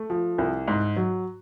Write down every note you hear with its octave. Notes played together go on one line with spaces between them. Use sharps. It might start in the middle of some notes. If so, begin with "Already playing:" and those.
Already playing: A3
F3
C2
G#2
F#3